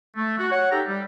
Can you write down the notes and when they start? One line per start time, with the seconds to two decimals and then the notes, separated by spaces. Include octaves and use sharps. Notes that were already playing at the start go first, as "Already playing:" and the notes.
0.16 A3
0.39 F#4
0.51 C#5 F#5
0.71 D#4 G4 A4 E5 G5 A#5
0.87 G3